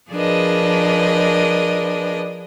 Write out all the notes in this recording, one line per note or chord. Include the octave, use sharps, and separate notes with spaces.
F3 D4 G#4 A#4 B4 D#5